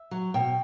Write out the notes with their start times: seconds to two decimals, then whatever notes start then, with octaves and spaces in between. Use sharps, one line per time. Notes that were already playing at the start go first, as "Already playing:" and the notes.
Already playing: E5
0.11 F#3
0.34 B2 G5